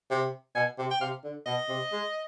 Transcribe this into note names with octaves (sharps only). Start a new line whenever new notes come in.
C3
B2 G#5
C3
G5
C3 F5
D3
B2 D#5
C3
G#3